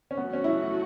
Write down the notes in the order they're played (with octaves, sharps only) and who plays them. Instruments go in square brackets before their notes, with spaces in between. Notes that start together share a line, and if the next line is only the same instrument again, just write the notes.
[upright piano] C#4
[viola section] F#3 A3 F#4 [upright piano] B3
[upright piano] C#4
E4